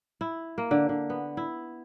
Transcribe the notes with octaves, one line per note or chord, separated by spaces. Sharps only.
E4
A#3
D3
D3
B3
E4